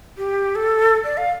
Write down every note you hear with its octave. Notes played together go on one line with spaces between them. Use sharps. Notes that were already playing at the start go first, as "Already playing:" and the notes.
G4
A4
D5
F5